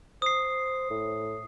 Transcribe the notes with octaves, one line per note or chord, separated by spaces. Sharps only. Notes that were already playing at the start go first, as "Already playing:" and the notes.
C5 D#6 C7
A2